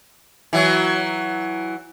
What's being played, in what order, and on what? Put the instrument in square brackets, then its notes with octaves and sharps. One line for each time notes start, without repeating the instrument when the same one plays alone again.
[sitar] E3 F#3